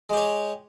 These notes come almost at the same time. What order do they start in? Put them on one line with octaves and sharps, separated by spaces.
G#3 G4 C#5